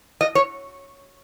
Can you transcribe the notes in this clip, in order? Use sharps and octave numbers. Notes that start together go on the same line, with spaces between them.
D#5
C#5